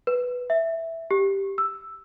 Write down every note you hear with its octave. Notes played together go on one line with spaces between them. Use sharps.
B4
E5
G4
E6